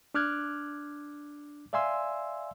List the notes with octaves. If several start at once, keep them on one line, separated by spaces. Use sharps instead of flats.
D4 D6 F6 F#6 G#6
D5 E5 F5 G#5 C6 E6